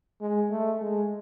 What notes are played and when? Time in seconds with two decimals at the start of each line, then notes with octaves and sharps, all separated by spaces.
0.21 G#3
0.51 A3
0.81 G#3